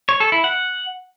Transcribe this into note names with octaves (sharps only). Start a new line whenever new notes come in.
C#5
A4
E4
F#5